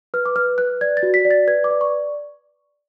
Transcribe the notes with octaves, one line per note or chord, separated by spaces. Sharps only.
B4 F6
D6
B4 F6
B4 F#6
D5 G#6
A6
F#4
B6
D5
A6
B4 G#6
D6
D5
C#6